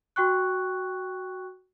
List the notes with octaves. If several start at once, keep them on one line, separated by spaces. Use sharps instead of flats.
F#4 G5 C#6 F#6